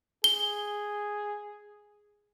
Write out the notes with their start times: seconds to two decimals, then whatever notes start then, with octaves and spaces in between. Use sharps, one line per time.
0.24 G#4 G7